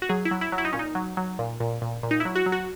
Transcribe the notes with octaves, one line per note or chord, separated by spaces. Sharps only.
F#4
F#3 G#4
E4
F#3
E4
F#3
E4
D#4
A#2 C#4
D#4
F#3
F#3
A#2
A#2
A#2
A#2
D#4
F#3 E4
F#4
F#3
F#4